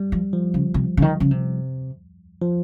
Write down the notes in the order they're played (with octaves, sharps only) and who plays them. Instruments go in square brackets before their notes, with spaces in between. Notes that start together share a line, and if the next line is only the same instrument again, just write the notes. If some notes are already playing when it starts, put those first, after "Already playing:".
Already playing: [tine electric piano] G3
[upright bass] F3
[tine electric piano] F3
[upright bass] C#3
C3
C#3
D#3
C#3
C3
[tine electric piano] F3